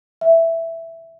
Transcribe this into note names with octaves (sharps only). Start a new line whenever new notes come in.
E5